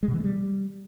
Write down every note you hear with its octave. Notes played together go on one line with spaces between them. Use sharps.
G#3
B2
E3
A3
G3